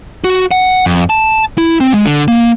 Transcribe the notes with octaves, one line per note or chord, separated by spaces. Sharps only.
F#4
F#5
F2
A5
E4
C4
G#3
D3
A#3